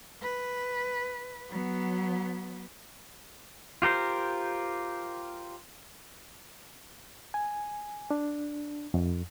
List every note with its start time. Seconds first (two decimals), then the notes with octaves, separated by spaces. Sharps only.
0.21 B4
1.49 F#3 B3
3.82 F4 G4 A#4 C5
7.34 G#5
8.11 D4
8.94 F2